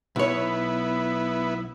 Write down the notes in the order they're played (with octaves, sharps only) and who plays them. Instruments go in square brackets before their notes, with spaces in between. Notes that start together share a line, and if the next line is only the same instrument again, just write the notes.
[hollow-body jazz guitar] B1 C#5 [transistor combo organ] B3 E4